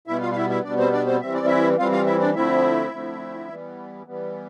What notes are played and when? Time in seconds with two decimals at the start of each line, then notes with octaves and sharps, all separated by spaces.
0.07 B2 G3 B3 E4 E5
0.21 F4 F5
0.32 F5
0.36 E4 E5
0.50 E4 E5
0.64 B2 G3 B3 D4 D5
0.78 C4 C5
0.92 D4 D5
1.06 C4 C5
1.21 E3 G3 C4 E5
1.34 D5
1.46 E4 E5
1.78 E3 G3 C4 F4 F5
1.92 F4 F5
2.06 E4 E5
2.20 D4 D5
2.35 D3 F3 A3 C4 E4 E5
2.91 D3 F3 A3 C4
3.49 E3 G3 B3
4.06 E3 G3 B3